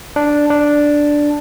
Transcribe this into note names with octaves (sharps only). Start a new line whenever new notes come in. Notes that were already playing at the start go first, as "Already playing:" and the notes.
D4
D4